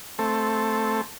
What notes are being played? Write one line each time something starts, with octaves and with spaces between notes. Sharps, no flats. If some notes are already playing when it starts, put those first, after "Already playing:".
A3 C4 A4